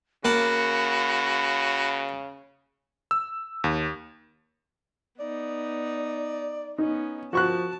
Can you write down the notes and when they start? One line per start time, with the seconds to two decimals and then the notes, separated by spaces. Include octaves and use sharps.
0.25 C#3 A#3 F#4 F#5 A5 B5
3.11 E6
3.64 D#2
5.19 B3 D#4 D5
6.78 B3 C#4 D#4
7.33 F3 F#4 A5 C#6 F#6